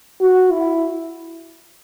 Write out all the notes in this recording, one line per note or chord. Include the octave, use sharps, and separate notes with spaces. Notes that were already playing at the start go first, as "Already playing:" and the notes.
F#4
E4